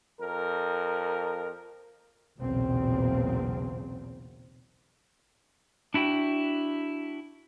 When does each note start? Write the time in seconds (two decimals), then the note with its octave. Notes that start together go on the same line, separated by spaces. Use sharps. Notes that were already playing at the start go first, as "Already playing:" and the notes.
0.20 F2 A#4
2.38 B1 E2 A#2 C#3 F#3 C4
5.94 D4 E4 F#4 G5